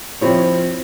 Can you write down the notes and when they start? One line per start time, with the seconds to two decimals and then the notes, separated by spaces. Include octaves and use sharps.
0.21 F3 C4 E4 C#5